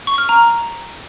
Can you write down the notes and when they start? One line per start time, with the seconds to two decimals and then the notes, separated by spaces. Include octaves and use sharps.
0.07 C#6
0.18 F6
0.29 A#5